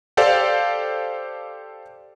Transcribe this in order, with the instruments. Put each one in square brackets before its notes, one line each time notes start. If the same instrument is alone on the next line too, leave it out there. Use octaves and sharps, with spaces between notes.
[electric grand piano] G4 A4 C5 D5 F5